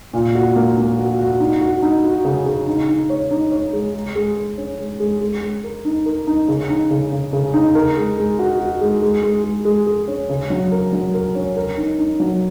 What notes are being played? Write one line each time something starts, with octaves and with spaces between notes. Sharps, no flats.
A#2
F#4
A#3
A#3
F#4
F#4
D#4
F#4
D#4
F#4
C#3
C#3
D#4
D#4
C#5
D#4
C#5
G#3
G#3
G#3
G#3
C#4
G#3
G#3
G#3
G#3
A#4
D#4
A#4
D#4
C#3
D#4
C#3
C#3
C#3
D#4
A#4
G#3
G#3
F#4
F#4
G#3
G#3
G#3
G#3
G#3
G#4
C#4
C#3
F#3
A#4
F#3
A#4
C#4
A#4
D#4
D#4
F#3